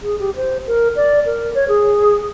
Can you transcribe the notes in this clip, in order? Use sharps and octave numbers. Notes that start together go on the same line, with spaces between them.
G#4
G4
C5
A#4
D5
A#4
C#5
G#4